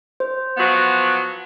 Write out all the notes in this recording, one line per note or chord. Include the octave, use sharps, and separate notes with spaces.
C5
F3 F#3 B3